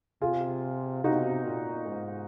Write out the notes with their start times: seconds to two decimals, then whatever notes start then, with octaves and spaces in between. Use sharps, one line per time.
0.21 C3 F4 G#4
1.04 C3 D#4 F#4
1.45 A#2
1.86 G#2